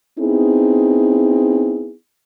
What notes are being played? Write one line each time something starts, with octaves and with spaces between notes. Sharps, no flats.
B3 C4 D#4 E4 G#4